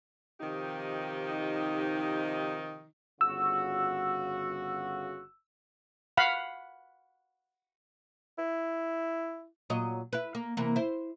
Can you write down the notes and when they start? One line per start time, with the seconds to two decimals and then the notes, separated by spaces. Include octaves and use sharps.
0.40 C3 D#3 F3 D#4 G4
3.21 G1 C#3 F#4 E6
6.17 F5 F#5 B5
8.38 E4
9.70 A#2 F#3 D#5
10.13 E4 B4
10.35 A#3
10.57 C3 E3 A#3
10.76 E4 C5